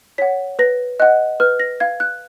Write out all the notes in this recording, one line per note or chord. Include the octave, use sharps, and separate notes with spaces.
C#5 F#5 B6
B4 A#6
D#5 F#5 F#6
B4 F6
A#6
F5 G#6
F#6